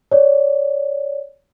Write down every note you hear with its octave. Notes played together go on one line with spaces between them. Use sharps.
C#5 D5